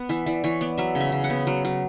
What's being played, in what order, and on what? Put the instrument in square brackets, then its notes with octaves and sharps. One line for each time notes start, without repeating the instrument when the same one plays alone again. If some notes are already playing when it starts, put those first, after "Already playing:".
Already playing: [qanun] B3 F#5
E3 E5
E3 D5
E3 C#5
B3 D5
F#3 E5
C#3
E5
C#3
F#5
B3
F#3
F#3